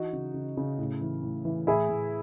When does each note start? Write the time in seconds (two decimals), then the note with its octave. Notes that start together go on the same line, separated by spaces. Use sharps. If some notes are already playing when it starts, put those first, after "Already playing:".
Already playing: E3 D#4 F#4
0.13 C#3
0.34 C#3
0.57 C#3
0.78 A2
1.01 E3
1.23 A2
1.45 E3
1.67 A2 E4 G#4
1.89 A2